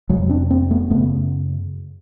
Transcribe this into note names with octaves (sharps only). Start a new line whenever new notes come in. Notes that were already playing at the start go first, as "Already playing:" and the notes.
F2 C3 F#3 G#3
C4 D4
A#3 C4
A3 B3
F#2 C#3 A3 B3